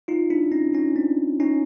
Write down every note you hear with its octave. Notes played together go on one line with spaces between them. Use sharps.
D#4 F4
D4 E4
C#4 D#4
C#4 D#4
C4 D4
C#4 D#4